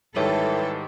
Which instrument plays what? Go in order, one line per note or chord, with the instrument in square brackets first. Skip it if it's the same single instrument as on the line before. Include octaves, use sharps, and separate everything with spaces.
[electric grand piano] G#2 D#3 G3 [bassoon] E3 [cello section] A4 [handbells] C#5 E5 G5